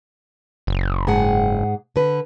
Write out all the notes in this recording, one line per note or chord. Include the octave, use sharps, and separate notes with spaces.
F#1
G#2 G#4 F#5
D3 B4